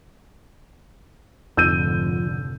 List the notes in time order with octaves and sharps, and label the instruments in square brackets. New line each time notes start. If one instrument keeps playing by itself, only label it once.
[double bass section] F1 G#2 D3 [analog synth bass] F2 [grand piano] E6 G6 D#7